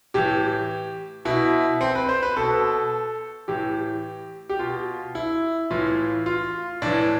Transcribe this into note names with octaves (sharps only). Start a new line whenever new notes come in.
A2 E3 G4
B2 E4
C4
B4
C5
B4
B2 A4
A2 E3 G4
G4
B2 F4
E4
A2 E3 F4
F4
A2 E3 D4